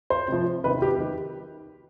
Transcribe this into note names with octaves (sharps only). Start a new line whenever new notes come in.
C5
C3 F3
C3 D#3 B4
G4
D#3